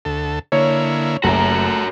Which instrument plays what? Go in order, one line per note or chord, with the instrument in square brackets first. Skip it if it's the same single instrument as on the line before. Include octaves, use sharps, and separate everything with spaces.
[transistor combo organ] D2 A4
[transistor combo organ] D3 A#3 E4 [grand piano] C#5
[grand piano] F#1 [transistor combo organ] A3 [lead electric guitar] F#4 A#4